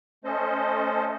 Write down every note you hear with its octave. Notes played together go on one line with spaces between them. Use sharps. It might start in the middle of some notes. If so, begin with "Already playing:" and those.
A3 C#4 A4 C5 D#5